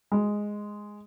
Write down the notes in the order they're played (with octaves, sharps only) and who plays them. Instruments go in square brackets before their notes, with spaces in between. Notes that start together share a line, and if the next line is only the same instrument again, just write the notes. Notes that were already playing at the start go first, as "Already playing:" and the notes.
[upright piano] G#3